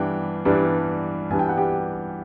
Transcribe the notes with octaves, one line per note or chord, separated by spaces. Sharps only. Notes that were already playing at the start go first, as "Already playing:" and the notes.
Already playing: G2 E3 G3 B3 D4 G5
G2 E3 G3 B3 D4
G2 E3 G3 B3 D4 G#5
G5
F#5
G4 G5